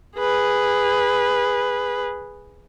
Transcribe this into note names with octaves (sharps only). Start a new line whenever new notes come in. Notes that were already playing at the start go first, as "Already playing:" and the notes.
G#4 B4